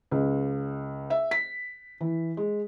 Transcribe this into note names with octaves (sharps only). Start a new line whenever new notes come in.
C#2
E5
B6
E3
G#3